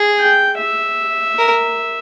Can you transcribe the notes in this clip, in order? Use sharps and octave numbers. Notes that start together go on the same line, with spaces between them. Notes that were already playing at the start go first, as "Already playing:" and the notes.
Already playing: G#4
G5
E5
A#4